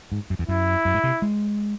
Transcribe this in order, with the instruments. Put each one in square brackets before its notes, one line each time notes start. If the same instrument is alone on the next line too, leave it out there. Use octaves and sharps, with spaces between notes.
[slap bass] G#2
F#2
E2
[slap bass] F#2 [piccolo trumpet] E4
[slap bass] F#2
G#2
C3
G#3